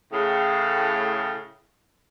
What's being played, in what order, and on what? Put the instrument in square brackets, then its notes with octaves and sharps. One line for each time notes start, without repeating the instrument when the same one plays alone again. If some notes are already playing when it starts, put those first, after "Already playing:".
[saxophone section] A2 C#3